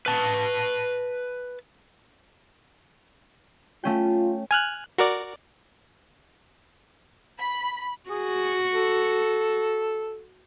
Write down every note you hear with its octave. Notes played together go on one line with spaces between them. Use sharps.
B4 A5
A3 C#4 F4 G5
G#5 F6 F#6
F#4 A#4 D5
B5
F#4 G#4
A4